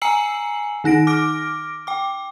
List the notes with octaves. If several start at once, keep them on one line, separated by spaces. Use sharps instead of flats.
G#5 A#5 E6 C7 C#7 F#7
D#3 D#4 A#6 D7
D6 F6 A#6 D7
G5 D6